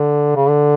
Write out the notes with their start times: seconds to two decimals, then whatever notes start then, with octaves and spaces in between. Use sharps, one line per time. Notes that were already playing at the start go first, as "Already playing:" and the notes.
Already playing: D3
0.36 C#3
0.48 D3